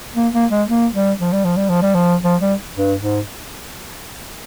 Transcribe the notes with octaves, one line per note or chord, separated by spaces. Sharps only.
A#3
A#3
G#3
A#3
G3
F3
G3
F3
G3
F3
G3
F3
F3
G3
G2
G#2